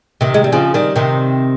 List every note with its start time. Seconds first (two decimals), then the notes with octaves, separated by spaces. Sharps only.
0.21 C3 D#3
0.34 G#3
0.44 G3
0.52 C#3 F3
0.74 D#3 G3
0.96 C3 D#3